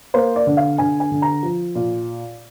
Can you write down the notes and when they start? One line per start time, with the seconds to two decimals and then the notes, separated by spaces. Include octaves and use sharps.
0.14 A#3 C5
0.36 D5
0.47 D3
0.57 F5
0.78 D3 G#5
1.00 G#5
1.11 D3
1.22 A#5
1.43 F3
1.75 A#2